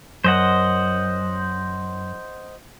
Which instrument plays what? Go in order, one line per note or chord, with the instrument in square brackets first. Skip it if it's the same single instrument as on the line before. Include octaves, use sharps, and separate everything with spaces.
[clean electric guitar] F#2 [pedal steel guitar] C5 D#5 F#5